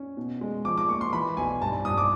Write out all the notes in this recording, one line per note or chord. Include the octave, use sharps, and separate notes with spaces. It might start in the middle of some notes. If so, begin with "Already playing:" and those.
Already playing: C#4
B2
G#3
F3 D6
D6
A#3 C#6
C6
E3 B5
B1 G#5
G2 A5
A5
G2 D#6
D6